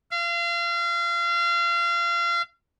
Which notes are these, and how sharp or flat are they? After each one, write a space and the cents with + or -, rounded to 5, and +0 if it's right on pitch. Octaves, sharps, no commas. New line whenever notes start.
F5 -30